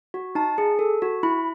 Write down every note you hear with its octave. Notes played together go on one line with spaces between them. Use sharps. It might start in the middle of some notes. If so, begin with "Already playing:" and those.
F#4
D#4 A5
G#4
A4
F#4
E4 B5